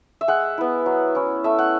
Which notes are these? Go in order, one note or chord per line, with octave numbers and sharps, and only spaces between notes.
E5
G#3 F#5
B3 E4
F#3
C#4 E4
A3 E5
F#5